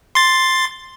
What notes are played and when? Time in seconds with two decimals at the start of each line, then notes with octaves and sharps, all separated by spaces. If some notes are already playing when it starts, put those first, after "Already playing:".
0.15 C6 A6